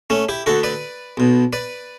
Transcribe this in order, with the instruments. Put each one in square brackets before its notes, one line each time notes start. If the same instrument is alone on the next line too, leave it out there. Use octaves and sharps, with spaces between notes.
[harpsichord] A3 C#4
E4 G4
D2 D3 F#4 A4
B4 D5
B1 B2
B4 D5